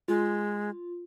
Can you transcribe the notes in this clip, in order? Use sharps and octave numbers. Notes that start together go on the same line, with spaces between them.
G#3 F4